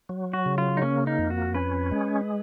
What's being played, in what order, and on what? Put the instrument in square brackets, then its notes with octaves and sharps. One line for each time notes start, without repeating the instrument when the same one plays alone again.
[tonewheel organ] F#3
[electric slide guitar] F#4
[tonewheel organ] C#3
[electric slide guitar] F4
D#4
[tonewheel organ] A#3 [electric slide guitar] C#4
[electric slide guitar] D#4
[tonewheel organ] F2
[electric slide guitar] F#4
[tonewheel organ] C#4 [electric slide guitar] B4
[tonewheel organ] G#3